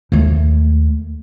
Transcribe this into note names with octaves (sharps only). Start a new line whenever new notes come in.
D#2 A3